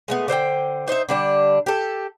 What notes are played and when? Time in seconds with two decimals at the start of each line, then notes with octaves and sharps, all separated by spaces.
0.08 G#3 A3 B3
0.28 D3 C5 E5 G5
0.88 D#4 C5 D#5 E5
1.09 D3 G3 D4
1.66 G4 A4